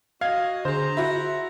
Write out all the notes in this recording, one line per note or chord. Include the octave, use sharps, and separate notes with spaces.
F#4 D#5 F5 G#6
D3 G#4 C5 A#5
E4 F#4 B5